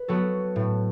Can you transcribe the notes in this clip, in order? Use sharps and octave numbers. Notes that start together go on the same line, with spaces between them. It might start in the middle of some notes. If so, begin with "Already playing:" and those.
Already playing: B4
F#3 B3 F#4 A4
A2